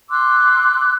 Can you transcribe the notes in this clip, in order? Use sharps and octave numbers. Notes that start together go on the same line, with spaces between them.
C6 D6 E6 F#6